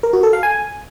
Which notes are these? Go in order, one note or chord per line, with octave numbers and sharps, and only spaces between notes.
A#4
F#4
A4
F5
G#5